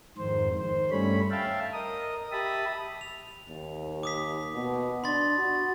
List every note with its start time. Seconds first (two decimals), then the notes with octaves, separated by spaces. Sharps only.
0.17 F2 G#2 D#3 C5
0.57 D#3 C5
0.91 G2 G3 A3 C#4 C#5 B5
1.31 E5 F5 G5 A5
1.73 A#4 D#5 D#6
2.32 G4 E5 A5 B5 D#6
3.01 F7
3.48 D#2
4.03 D6 D#6 B6
4.54 B2
5.04 D4 B5 C6 A6
5.38 F#4